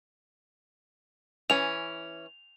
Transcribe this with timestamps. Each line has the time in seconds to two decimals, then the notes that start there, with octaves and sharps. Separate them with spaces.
1.50 E3 C#4 F7